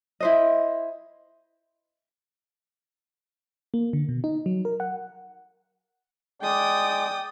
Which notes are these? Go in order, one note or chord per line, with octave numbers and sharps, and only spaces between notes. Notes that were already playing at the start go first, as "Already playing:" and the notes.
E4 C5 D#5
A#3
D3
B2
D#4
F#3
A#4
F#5
G#3 D5 G5 D#6